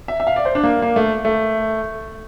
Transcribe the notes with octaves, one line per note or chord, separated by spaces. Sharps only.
E5
E5
F5
D5
C5
D4
A#3
A#3
A3
A3